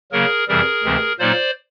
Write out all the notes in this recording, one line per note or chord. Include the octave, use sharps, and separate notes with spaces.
C#3 F#3 A#3 G#4 A#4
F2 C3 E3 G3 G#4 A#4
D2 C3 E3 G#3 C4
A#2 F#3 A#3 D#4 C5 D5